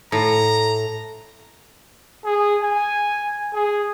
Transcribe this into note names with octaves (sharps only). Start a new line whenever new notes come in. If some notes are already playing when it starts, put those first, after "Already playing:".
A2 A#5
G#4
G#5
G#4